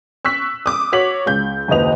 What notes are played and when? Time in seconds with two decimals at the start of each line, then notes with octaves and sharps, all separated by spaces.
0.25 C#6 E6 F#6 B6
0.66 D6 D#6
0.92 F#4 C#5 D6 B6 F#7
1.26 C#2 G6
1.68 F#1 D#2 B4 D#5 F7